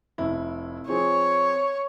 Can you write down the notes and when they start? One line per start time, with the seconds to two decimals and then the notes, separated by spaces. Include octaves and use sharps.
0.18 F1 E4
0.88 F3 C4 G#4 C#5